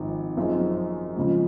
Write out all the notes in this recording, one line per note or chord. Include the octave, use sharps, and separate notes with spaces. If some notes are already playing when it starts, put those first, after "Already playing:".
Already playing: G#1 G#2 F3
F#2 F3 C4 D#4 G#4
F2 C#3 F3 G#3